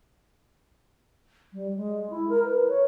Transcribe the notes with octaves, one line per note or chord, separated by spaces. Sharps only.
G3
G#3
E4
A#4
B4
C#5